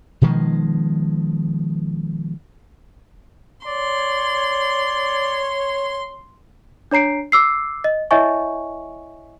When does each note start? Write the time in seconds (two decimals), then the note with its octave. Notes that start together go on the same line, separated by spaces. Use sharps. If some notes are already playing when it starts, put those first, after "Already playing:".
0.22 B2 D#3 F3 G#3
3.67 C#5 D5 C6
6.91 D4 C#5 A#5 C7 D7
7.32 D6 E6 C7
7.84 D#5
8.11 E4 C#5 D#5 E5 G#5 C#6